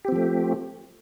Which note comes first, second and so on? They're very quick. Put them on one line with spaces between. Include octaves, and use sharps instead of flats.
G4 C4 F3 A3